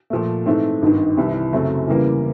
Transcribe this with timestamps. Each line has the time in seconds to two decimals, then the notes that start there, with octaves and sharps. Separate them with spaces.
0.10 A#2 F3 A3
0.46 G#2 E3 A3 C4
0.82 G#1 G2 D#3
1.17 C2 C3 E3 G3
1.53 F#2 C#3 F#3 A3 C4
1.88 E2 C#3 E3 G3 A#3